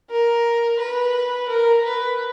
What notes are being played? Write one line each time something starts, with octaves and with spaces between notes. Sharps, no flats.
A#4
B4
A#4
B4